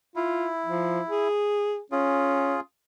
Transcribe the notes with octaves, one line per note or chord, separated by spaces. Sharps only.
E4 F4
F3
G#4
C#4 F4 G#4